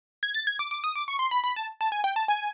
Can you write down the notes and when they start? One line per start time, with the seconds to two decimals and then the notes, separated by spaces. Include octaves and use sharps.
0.23 G#6
0.34 A6
0.47 G#6
0.59 D6
0.71 D6
0.84 D#6
0.96 D6
1.08 C#6
1.19 C6
1.31 B5
1.44 B5
1.56 A5
1.81 A5
1.92 G#5
2.04 G5
2.16 A5
2.28 G#5